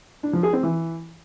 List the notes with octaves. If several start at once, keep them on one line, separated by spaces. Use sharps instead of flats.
D4
F3
G#4
C4
E3